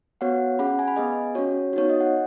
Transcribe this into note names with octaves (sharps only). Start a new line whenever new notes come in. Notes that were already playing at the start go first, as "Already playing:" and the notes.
B3 F#4 C#5 F#5
C#4 G#4 F#5 B5
G#5
B5
B3 G#4 D#5 G#5
C#4 F#4 C#5
B3 D#4 F#4 C#5
D#5
F#5